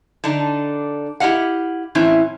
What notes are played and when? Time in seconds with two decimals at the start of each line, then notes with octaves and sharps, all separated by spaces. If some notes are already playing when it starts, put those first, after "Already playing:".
0.24 D3 D4 D#4
1.20 E4 G4 D#5 F5 F#5
1.95 A2 E3 C4 C#4 E4